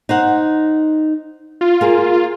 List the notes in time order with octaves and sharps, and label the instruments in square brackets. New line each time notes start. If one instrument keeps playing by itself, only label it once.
[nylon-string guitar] D#4 C5 F#5
[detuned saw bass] F4
[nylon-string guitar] A#3 G#4